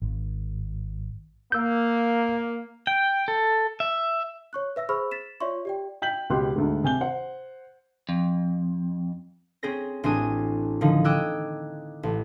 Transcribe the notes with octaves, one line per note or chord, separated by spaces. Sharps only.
G#1
A#3 E6 G6
G5
A4
E5
C#5 C#6 F#6
B4 E5 E6 A#6
G#4 C5 B5 C#6 E6 F6
A6 B6 E7
F4 C#5 D5 E5 C6 C#6
G4 D5 G5
G5 G6 B6 F#7
C#2 B2 G4 C6 F#6
D2 G#2
C3 G#5 G6 G7
C5 F#5
F2
C4 C#4 G#4 C5 A#6
A1 C4 D4 F#4 G#5 D#6
D3 D#3 F3 D#4
D#5 G5 D6 E6 F#6 G#6
A1